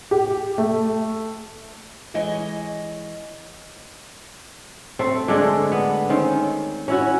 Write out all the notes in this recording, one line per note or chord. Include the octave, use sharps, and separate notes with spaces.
G4
A3
E3 G#3 C#5 D#5 G#5
A3 C4
D3 G#3 A3 D4
B3
D#3 C4 C#4
C#4 E4 F#4